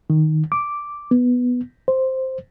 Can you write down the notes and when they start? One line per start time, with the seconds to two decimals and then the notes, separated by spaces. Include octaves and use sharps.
0.10 D#3
0.52 D6
1.11 B3
1.88 C5